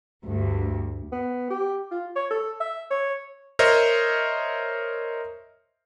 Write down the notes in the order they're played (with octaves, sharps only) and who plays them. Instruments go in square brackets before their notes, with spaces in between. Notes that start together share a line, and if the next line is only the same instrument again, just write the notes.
[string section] D2 G2
[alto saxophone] B3
G4
F4
C#5
A4
E5
C#5
[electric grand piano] A#4 C5 C#5 D#5 E5